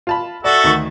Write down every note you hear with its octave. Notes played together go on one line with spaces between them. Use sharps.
F4 A5 B5
F#4 A4 D5 E5
D2 D#3 C#6